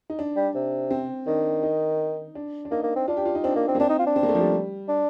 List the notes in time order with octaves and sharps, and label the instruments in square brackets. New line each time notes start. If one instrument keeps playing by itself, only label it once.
[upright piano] D#4
D4
[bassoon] G3
C3
[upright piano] C4
[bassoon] D#3 [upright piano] D4
[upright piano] D#4
D4
D4
[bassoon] A#3 [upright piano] D#4
[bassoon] A#3
C4
[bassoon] D4 [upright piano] F4
[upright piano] G4
F4
D#4
[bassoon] C4 [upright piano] D4
[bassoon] A#3
C4
[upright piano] A#3
[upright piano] C4 [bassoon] D4
[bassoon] D#4
F4
D4
[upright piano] C4
A#3
A3
F3
G3
[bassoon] D4